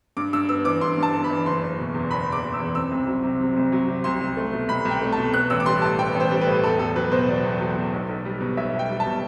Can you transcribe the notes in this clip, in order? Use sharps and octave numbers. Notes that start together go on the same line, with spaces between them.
G2 D6
G2 E6
B3 E6
E3 D6
G2 C6
G2
A5
B3
B5
E3
F#1 C6
F#1
B2
E2
F#1 B5
F#1
D6
B2
E6
E2
C4 E6
C2
F#3
C3
C4
C2
F#3
C3
C2 C6
C2
A3
B2
C2 B5
C2
G5
A3
A5
B2
B3 F#6
A1 E6
D6
G3 C6
A2 A5
B3 G5
A1
C5
G3
B4
A2
E2 A4
E2 A4
F#3 B4
B2 C5
E2 D5
E2
F#3
B2
B1
B1
G3
B2
B1 E5
B1
G5
G3
A5
B2